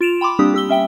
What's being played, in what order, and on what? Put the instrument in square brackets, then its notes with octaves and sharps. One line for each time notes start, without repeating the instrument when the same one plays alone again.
[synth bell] F4 D7 E7 F7
G5 B5 C6 D6
G3 A#3 C4 D4 G4 D#6
G4 E6 G7
C#4 E5 G5 G7